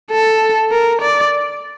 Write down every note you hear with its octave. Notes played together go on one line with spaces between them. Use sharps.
A4
A#4
D5